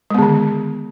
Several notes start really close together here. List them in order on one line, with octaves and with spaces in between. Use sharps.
G#3 B3 D3 D#3